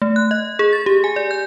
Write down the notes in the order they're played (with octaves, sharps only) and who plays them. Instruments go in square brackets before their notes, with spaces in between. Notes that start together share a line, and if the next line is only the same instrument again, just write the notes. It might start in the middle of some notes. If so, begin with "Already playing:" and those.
[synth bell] A3
F#6
D#5
G#4
A6
G4
G#5
D5
G6